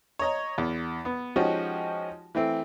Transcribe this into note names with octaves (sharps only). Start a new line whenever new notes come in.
C#5 D#5 A#5
E2
B3
F3 G#3 C#4 D#4 F#4 G4
E3 A3 C4